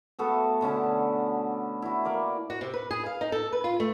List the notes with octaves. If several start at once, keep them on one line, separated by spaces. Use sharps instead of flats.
A3 B3 F#4 A4
B2 D3 C#4 A5
E4 F#4
A#3 A#4 D5
F#4
C3
B4
G#4
F5
D#4
A4
B4
F4
A3